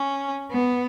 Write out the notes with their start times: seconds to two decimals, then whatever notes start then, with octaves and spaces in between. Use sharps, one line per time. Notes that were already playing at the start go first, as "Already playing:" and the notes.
Already playing: C#4
0.52 B3